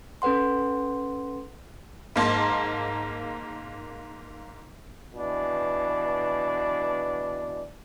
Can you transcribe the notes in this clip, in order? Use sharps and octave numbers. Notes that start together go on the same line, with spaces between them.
C#4 A4 B4 F#5 C6
G#2 A#3 A5 C6
B2 E3 D4